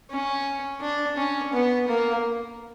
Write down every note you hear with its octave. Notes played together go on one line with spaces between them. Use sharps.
C#4
D4
C#4
B3
A#3